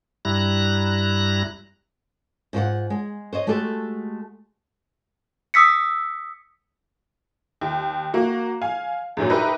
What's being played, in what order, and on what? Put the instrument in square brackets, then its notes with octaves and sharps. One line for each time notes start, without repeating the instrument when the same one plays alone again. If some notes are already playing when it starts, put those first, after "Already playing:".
[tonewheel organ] G2 G3 E4 A#5 F#6 A#6
[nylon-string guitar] G#2 F4 C5 F#5
G#3
C5 C#5 D#5
G#3 A3 F#4 G4 A4
[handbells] D#6 E6 B6 C#7
[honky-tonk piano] D#2
A#3 F#4
F5 G#5
E2 G2 A#2 F#3
D#4 G4 A#4 B4 E5 A#5